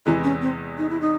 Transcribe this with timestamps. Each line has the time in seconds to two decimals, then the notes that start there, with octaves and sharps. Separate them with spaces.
0.06 E2 C3 E3 G#3 E4
0.23 C#4
0.41 C4
0.78 D#4
0.89 E4
1.01 D#4